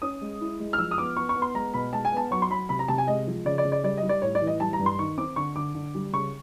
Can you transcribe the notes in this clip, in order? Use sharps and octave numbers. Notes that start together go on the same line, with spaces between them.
C#4 D#6
G#3
E4
G#3
F6
F3 E6
D#6
B3 D6
B3 C#6
C#6
B3
C6
G#3 A#5
B2 B5
G#3 A5
G#5
B3 A5
F#3 C#6
C6
F#3 B5
C3 B5
A#5
C3 A5
G#5
G#3 D#5
F3
C#3 D5
D5
C#3
D5
G3 D5
D#5
G3
D5
A2 C#5
D5
E3
D#5
G3 A5
A#5
G2
C6
D#3 C#6
C4 D6
D3 C#6
D3 D6
D3
G3
C#3 C#6